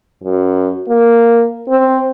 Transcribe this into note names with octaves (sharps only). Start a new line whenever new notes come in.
F#2
A#3
C4